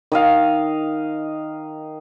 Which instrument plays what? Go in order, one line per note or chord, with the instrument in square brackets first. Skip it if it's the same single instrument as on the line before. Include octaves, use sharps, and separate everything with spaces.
[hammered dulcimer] D#3 D#5 F5